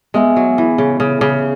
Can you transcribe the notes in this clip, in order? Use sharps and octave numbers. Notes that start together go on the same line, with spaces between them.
G#3 B3 G#4 E5 G#5
F#3
E3
C#3
C#3
C#3